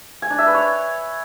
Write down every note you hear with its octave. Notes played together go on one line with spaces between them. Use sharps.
G#5
D4
E5
B4
C#5